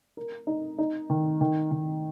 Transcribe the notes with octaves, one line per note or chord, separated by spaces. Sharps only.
A#4
D#4
D#4
D#3
D#3
D#3